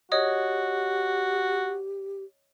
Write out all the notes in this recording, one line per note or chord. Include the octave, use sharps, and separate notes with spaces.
F#4 G4 C#5 D#5 D#6